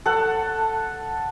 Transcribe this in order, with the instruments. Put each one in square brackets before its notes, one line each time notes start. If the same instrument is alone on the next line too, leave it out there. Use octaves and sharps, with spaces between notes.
[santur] A4 F#5